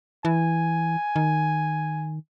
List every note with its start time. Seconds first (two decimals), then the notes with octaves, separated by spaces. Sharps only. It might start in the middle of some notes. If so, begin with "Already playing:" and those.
0.25 E3 G#5
1.16 D#3